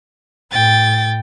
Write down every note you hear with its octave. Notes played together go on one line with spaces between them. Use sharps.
A2 G5 A6